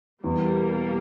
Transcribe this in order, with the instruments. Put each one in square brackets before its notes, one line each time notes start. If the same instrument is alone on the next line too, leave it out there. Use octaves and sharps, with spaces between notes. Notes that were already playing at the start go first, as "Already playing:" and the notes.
[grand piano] E2 [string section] B2 G3 A#3